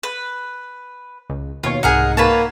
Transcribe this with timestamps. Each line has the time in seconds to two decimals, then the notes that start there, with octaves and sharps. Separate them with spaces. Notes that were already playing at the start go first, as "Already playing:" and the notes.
0.03 B4
1.30 C#2
1.63 D#2 B2 F4 C#5
1.83 C2 G#2 D#4 G#4 A#4 F#5
2.17 A#3 B4 C#5 A5